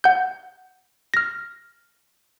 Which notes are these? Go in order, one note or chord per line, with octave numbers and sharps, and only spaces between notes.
F#5 G6
F6 A#6